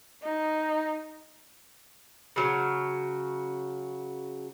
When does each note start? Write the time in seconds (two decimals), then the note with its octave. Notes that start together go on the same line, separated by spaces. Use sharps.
0.23 D#4
2.36 C#3 F#3